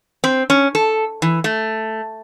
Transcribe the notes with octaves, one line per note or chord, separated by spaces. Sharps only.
C4
C#4
A4
E3
A3